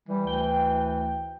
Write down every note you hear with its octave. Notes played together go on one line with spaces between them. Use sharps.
E3 G3
D2 G5